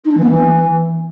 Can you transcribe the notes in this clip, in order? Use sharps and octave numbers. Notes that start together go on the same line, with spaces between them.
D#4
D4
E3
B3
E3